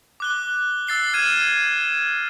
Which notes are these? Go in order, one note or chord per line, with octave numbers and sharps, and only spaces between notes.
D6 F#6 G7
E6 A6 C7 G7
F6 G#6 D#7 E7